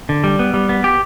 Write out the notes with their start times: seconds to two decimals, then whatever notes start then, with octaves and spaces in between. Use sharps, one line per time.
0.09 D3
0.24 G3
0.39 B3
0.54 G3
0.69 B3
0.84 G4